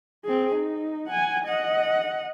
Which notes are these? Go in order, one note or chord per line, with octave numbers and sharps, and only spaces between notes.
C4 G#4
D#4
F#5 G#5
D#5 F#5